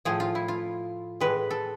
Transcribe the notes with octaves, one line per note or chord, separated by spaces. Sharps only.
A2 F3 A3 G#4
F4
E4
F4
A2 E3 G#3 B4
A4